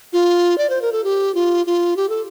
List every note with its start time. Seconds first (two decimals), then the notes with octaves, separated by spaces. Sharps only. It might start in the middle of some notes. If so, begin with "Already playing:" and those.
0.13 F4
0.58 D5
0.70 C5
0.82 A#4
0.92 A4
1.04 G4
1.35 F4
1.66 F4
1.97 G4
2.09 A4